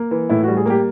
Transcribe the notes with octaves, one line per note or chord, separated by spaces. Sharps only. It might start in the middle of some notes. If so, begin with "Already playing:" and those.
Already playing: A#3
E3
A2 E4
F#4
G3
G#4
A#3 G4